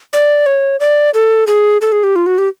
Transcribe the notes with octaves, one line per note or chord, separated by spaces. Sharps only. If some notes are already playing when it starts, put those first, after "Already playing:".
D5
C#5
D5
A4
G#4
A4
G#4
G4
F4
F#4
G4